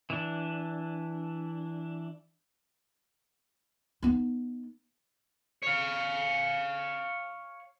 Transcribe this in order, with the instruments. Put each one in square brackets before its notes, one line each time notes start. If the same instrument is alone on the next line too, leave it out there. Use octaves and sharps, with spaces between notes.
[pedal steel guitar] E3 D4
[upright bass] B3 D#4
[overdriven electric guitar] C#5 F5